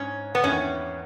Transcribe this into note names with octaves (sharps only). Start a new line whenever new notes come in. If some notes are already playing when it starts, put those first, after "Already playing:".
Already playing: G#2 C#4
B3
E2 D#3 A#3 C#4 E4 B4